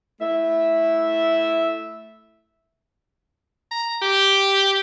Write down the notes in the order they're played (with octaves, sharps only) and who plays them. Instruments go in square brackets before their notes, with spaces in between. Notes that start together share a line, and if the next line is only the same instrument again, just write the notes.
[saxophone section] A3 E4 E5
[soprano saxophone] A#5
G4